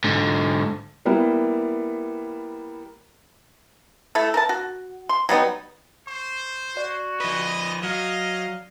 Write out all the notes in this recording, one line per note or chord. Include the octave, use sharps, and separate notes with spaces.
G#2 D3
G3 A#3 B3 E4
A3 E4 A4
A#4 B4 A5
F#4
C6
F#3 G3 B3 D#4
C5 C#6
F#4 D5
F3 B4 D#5
F#3 D#5 F5